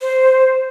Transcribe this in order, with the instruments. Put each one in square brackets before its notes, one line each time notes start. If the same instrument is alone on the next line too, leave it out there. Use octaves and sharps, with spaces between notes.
[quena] C5